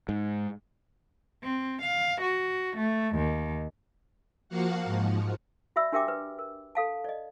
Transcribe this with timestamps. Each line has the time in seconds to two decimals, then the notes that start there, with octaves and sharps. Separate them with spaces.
0.09 G#2
1.44 C4
1.82 F5
2.21 F#4
2.77 A3
3.16 D#2
4.49 F3 A#3 F#4 F5 F#5
4.85 G#2 F3
5.76 F#4 D5 E5 B5 E6
5.92 D4 G4 A#4 E5 G5 D6
6.08 B4
6.39 A#4
6.75 A4 F5 A5
7.04 D5 D#5